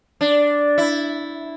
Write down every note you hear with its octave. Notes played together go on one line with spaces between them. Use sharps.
D4
E4